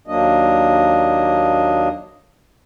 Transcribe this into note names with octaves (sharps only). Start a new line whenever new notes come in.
D#2 F#3 A#3 D4 D#5